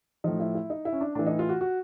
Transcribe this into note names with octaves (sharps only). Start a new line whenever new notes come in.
A2 F3 D#4
E4
E4
D#4
E4
C#4
D4
A2 E3 D4
D#4
F4
F#4
F#4